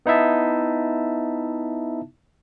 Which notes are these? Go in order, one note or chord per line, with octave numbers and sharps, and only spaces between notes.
B3 D#4 E4 E5 A5